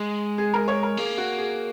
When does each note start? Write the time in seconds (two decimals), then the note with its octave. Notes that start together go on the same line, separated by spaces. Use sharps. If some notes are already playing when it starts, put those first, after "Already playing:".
Already playing: G#3
0.38 G#4
0.53 A#4
0.68 C#5
0.83 A#4
0.97 A#3 G#4
1.18 F#4
1.38 G#4